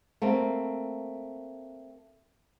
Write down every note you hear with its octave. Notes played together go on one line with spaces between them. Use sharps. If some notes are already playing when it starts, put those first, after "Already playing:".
A3 A#3 C4